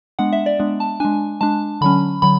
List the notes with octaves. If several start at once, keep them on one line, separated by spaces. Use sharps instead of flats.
G#3 B3 D4 F#5
E5
D5
G#3 B3 D4
A5
G#3 D4 G#5
G#3 D4 A5
D3 F#3 C#4 B5
D3 F#3 B5